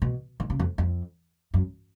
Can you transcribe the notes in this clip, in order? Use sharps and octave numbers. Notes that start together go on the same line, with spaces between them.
B2
D#3
C#3
F2
F2
F#2